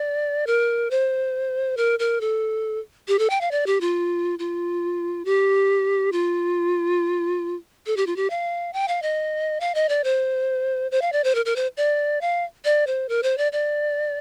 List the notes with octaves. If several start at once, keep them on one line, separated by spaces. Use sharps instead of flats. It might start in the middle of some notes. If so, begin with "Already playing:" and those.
Already playing: D5
A#4
C5
A#4
A#4
A4
G4
A4
G5
F5
D5
G4
F4
F4
G4
F4
A4
G4
F4
G4
F5
G5
F5
D#5
F5
D#5
D5
C5
C5
F5
D5
C5
A#4
A#4
C5
D5
F5
D5
C5
A#4
C5
D5
D5